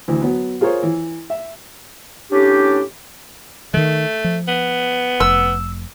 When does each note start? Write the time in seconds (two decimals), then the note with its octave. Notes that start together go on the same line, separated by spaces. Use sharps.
0.08 D2 E3
0.22 F#3 B3
0.61 F4 G#4 A#4 C5 C#5
0.83 E3
1.30 E5
2.31 A2 C#4 D4 G4
3.74 D#3 E3 A3
4.24 F3
4.48 B3
5.20 F1 E6